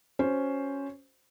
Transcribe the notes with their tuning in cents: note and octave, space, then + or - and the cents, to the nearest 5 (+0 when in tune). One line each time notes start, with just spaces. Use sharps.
C#4 +0 F#4 -5 C5 +0